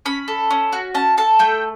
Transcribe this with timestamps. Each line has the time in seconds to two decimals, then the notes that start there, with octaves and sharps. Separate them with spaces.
0.05 C#4 B5
0.28 A4
0.51 C#4
0.73 F#4
0.94 C#4 A5
1.17 A4 A5
1.39 A3 G5